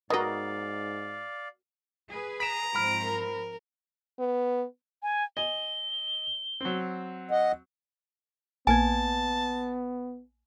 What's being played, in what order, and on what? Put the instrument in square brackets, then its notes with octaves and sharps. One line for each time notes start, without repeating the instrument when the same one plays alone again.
[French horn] G#2 [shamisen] B3 D#4 [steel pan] F#4 A#4 D#5 [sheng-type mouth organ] D5 F5
[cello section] G#4 B4
[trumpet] A#5 [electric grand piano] B6 D7 E7
[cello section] G#2 F3 C4 [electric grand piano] B5 F6 [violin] D7
[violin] A#4
[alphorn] B3
[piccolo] G#5
[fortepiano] D#5 G#5 [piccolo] G7
[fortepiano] F#3 C4
[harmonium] D#5 F#5
[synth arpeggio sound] A#1 A#3 G#6 [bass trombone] B3 [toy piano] G#5 [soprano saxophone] A5